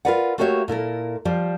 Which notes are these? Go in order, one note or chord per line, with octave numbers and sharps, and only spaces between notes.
F4 G#4 A#4 B4 D5 F#5
A3 A#3 F#4 G4 C#5 E5
A#2 E4 A4 A#4
F3 G3 C5 D5